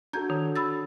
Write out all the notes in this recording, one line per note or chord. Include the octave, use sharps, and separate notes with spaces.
D4 F#4 A4 A#5 G6 G#6
D#3
B5 E6 A6